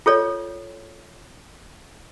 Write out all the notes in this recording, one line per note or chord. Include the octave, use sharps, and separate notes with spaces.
F4 A4 C#5 D5